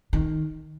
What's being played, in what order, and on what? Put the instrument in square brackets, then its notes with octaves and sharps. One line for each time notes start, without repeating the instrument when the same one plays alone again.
[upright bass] D#3